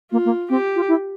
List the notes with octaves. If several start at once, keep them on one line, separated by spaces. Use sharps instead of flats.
A#3 F4
A#3
C4 G4
F4
E4